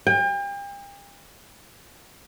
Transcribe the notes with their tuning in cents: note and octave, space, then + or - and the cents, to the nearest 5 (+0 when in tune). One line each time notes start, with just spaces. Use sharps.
G5 +40